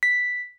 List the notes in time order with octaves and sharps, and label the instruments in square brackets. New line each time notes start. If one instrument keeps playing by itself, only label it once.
[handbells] B6